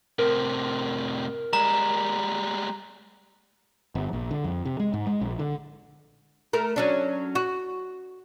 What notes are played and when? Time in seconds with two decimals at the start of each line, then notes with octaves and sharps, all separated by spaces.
0.19 A2 C3 A#4
1.53 G3 G#3 A#5
3.95 G1
4.13 A#1
4.31 D3
4.44 F2
4.65 C3
4.80 G#3
4.94 G#2
5.07 G#3
5.21 A#1
5.39 D3
6.53 A3 A#4
6.76 F#3 C#4 D4
7.35 F#4